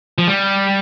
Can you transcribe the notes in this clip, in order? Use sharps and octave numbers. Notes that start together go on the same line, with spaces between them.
F3
G3